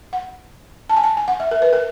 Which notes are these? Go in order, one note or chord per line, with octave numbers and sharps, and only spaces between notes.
F#5
A5
G#5
A5
G#5
F#5
E5
A#4
B4
A#4